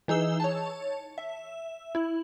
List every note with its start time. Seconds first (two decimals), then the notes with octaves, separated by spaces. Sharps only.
0.08 E3 D#4 G#4 E6 G7
0.40 C#5 A5
1.18 E5
1.95 E4